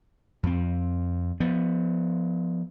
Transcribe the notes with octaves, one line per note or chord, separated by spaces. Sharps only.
F2 C4
F3 B3